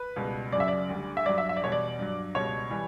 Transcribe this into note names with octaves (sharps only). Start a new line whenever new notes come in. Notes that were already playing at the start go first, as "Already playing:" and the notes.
Already playing: B4
C#2 B2 G3
F#2 C#3 F#3 D5 E5
D5
D2 D3 G3
E5
G2 F#3 D5
E5
E5
D5
E2 B2 G3 C#5
D5
G2 F#3
C#2 B2 G3 C#5
E3 G3